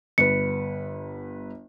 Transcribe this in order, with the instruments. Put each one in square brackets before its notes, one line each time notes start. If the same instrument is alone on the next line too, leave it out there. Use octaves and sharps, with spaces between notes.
[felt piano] G1 B4 [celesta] C#7